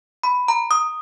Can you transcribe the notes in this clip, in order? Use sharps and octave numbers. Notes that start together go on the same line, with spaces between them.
B5
A#5
D#6